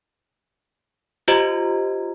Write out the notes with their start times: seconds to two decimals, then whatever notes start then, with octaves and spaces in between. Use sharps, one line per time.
1.28 F4 G4 C5 D#5 A#5 G#6